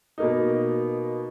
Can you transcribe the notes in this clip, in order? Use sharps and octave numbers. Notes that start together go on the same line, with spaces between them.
B2 A#3 D#4